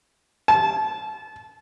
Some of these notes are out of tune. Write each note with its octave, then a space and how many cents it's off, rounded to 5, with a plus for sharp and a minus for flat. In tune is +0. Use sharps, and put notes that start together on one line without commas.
A5 -25